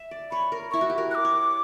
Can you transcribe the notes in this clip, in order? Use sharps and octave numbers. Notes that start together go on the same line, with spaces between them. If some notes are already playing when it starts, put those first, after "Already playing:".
Already playing: E5
D5
C#5 B5
A#4
E4 C#6
F#4
G4
A#4
F#6
D6
C#5